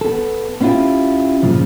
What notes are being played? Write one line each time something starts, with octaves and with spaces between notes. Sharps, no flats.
B3 A4
B3 C#4 D4 E4 F4 G4
G2 A#2 C#3 F3